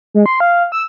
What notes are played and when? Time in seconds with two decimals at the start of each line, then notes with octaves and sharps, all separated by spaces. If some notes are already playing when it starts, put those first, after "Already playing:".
0.14 G#3
0.26 C6
0.40 F5
0.72 E6